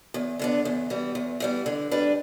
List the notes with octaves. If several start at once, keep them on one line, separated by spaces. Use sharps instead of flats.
E2
D3 B3 D4
E2
E3 G3 B3
E2
E3 G3 B3
D3
G3 D4 B4